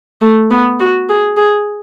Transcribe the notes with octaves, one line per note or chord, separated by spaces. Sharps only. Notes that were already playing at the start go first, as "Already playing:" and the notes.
A3
B3
F#4
G#4
G#4